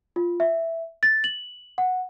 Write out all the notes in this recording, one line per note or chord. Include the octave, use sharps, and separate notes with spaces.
F4
E5
A6
F#7
F#5